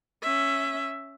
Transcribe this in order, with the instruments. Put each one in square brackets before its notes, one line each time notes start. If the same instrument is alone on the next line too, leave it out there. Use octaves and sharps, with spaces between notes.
[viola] C#4 E5